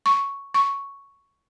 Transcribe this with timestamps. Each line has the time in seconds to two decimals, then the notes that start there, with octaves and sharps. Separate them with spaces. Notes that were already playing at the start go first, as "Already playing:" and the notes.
0.06 C#6
0.54 C#6